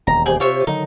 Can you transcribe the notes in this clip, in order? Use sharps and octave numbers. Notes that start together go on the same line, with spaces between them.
E1 D#2 A#5
G4 G#4 C5 G5
C3 F4 C#5 E5
D3 D#3 F#3 D#4